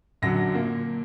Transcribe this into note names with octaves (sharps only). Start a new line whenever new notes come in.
F#2 D3 F#3 A#6
A#2 A#3